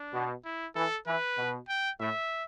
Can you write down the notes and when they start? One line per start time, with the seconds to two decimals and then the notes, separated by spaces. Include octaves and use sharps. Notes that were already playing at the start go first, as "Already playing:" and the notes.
Already playing: D4
0.14 B2
0.45 E4
0.75 E3 A4
1.07 E3 B4
1.38 B2
1.69 G5
2.00 A2 E5